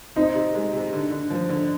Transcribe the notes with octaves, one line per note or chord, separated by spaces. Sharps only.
C4 D#4
C3
G#3
C3
D3
D3
F3
D3